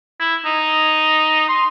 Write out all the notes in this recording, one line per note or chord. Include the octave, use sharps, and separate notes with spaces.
E4
D#4
C6